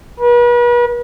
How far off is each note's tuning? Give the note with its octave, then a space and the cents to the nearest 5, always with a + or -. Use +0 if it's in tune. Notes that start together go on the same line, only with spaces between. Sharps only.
B4 -40